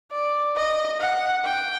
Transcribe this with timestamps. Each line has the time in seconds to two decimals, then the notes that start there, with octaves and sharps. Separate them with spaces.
0.12 D5
0.56 D#5
1.00 F#5
1.44 G5